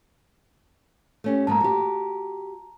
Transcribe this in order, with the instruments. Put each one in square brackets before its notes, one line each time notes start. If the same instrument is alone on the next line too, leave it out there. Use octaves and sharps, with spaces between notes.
[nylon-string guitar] A3 C#4 G4
[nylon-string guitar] G#2 F3 A#3 [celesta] A5 A#5
[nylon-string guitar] F#4 G4